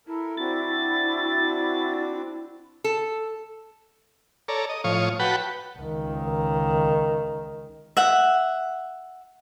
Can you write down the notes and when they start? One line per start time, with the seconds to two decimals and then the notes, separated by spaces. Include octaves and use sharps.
0.07 E4 A4 A#4
0.37 C4 D4 F#4 A6
2.84 A4
4.48 A4 C#5 D5 A#5
4.69 D#5
4.84 A2 F3 C#5 F5 C#6 D#6
5.19 F#4 B4 F#5 G5 A5 B5
5.78 C#2 D#3
7.97 E5 F#5